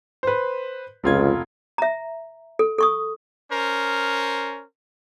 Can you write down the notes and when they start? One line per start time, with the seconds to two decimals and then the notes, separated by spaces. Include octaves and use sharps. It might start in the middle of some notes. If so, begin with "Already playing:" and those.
0.23 B4 C5
1.04 F1 C#2 F4 G#6
1.78 E5 A#5
2.59 A4
2.78 A4 C#6 D#6
3.51 C#4 A#4 C5